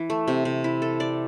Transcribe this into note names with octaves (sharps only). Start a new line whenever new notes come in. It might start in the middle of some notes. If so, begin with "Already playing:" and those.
Already playing: E3
A3
C3
C3
E4
A4
D5